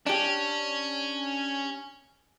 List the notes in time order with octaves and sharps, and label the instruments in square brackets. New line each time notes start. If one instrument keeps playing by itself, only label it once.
[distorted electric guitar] C#4 [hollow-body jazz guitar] D4 G4